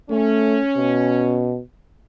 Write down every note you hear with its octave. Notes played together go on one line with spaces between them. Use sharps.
A3 C#4
B2